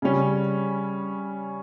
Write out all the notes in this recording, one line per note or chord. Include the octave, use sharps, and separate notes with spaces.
C#3 G3 C#4